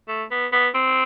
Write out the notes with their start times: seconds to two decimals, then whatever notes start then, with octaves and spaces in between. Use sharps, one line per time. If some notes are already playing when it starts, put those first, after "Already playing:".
0.08 A3
0.31 B3
0.52 B3
0.74 C4